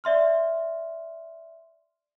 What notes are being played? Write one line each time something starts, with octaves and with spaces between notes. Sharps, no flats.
D5 E5 C6 F6